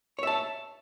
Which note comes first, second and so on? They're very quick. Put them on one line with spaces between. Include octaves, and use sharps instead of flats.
C#5 E5 A5